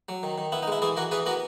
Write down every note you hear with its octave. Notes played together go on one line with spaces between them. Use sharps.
F#3
D#3
D#3
B3 E4
D#4
G#3 E4
E3 E4 G#4
E3 F#4 A#4
E3 G#4 B4
B3 F#4 A#4